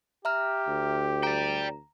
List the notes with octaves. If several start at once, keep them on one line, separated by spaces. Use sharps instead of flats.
G4 E5 A#5 F6
D2
D5 G5 A#5